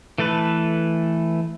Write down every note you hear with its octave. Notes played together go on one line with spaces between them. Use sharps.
E3 A3 A4 B4